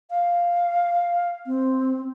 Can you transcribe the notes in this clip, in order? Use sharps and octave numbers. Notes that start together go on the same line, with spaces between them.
F5
C4